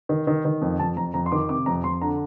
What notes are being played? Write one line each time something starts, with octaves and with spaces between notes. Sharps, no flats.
D#3
D#3
D#3
F2
F2 A5
F2 A#5
F2 A#5
C6
D#3 D6
C3 D6
F2 A#5
F2 C6
D3 A#5